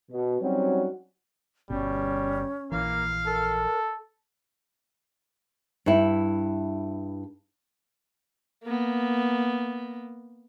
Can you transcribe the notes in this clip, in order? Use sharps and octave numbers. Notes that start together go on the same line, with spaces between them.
B2
F#3 G3 C4 C#4 D#4 F#4
G1 B2 G3 C#4
A#1 E3 A#3 F5
A4 A#4
G2 E4
A#3 B3